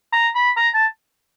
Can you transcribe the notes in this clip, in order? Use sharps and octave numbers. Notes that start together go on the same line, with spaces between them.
A#5
B5
A#5
A5